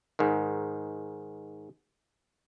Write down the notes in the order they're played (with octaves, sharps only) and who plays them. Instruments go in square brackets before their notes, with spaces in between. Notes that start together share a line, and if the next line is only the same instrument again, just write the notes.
[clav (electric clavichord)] G#2 D#3